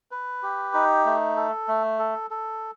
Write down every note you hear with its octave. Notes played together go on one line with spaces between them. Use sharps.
B4
G4
D#4
A3
A4
A3
A4
A4